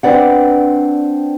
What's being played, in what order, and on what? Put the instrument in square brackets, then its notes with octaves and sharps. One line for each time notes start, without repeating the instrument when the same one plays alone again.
[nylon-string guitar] C4 D4 B4 D5 F#5